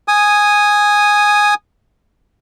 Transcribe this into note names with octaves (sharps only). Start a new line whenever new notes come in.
G#5 D#6